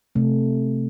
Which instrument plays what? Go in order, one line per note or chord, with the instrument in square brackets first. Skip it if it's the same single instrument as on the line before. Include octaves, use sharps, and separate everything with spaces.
[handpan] C3 A3